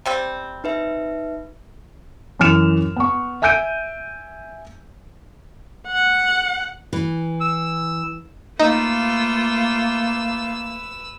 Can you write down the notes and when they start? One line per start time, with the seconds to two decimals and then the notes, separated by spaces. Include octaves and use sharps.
0.06 C3 G3 C4
0.64 D#4 B4 E5
2.39 F#2 E3 F6 E7
2.96 B3 C#6
3.42 E5 G#5 E6 G6 D7 D#7
5.88 F#5
6.93 E3
7.41 E6
8.59 A3 A#3 D#4 F4 B4 E6